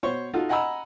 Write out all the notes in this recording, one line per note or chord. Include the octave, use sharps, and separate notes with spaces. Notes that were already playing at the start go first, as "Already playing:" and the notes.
B2 C5 C#5 C#6
D#4 F4 F#4 A4
D#5 F#5 G#5 A#5 B5 E6